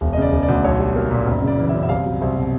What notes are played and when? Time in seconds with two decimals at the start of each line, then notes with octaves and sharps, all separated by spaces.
0.01 E1
0.13 D#5
0.17 C#3 D5
0.32 E1
0.43 D5
0.49 D2
0.64 B1 C#5
0.79 G3
0.96 A#3
1.11 A#2
1.26 F#1
1.42 C#3
1.47 D5
1.58 E3
1.69 E5
1.74 F#2
1.83 E5
1.89 C2 F5
2.06 F#3
2.21 C2 E5
2.36 B2